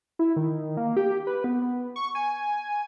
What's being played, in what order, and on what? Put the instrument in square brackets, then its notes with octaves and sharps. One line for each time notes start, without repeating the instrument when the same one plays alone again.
[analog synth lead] E4
D#3
A#3
G4
B4
B3
C#6
G#5